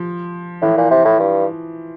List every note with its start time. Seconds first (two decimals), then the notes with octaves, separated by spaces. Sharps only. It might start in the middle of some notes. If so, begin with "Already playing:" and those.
Already playing: F3
0.62 A2 E3
0.77 A#2
0.91 C3
1.05 A2
1.20 G2